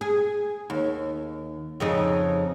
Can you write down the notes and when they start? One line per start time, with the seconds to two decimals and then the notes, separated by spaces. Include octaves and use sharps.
0.01 G#4
0.70 D#2
1.80 F2 C#3 D#4